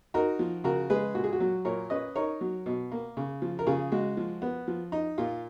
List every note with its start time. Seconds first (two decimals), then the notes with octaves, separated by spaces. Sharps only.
0.14 D#4 F#4 A#4
0.39 F3
0.64 C#3 F#4 A#4
0.90 G#3 G#4 B4
1.15 A#2 F#4
1.24 G#4
1.33 F#4
1.40 F#3
1.65 A#2 A#4 C#5
1.90 C#4 B4 D#5
2.15 D#4 A#4 C#5
2.41 F#3
2.66 B2
2.92 A#3
3.17 C#3
3.42 F3
3.59 A#4
3.67 C#3 F4 G#4
3.92 G#3 F#4
4.17 F3
4.42 B3
4.68 F3
4.92 D#4
5.18 A#2 F4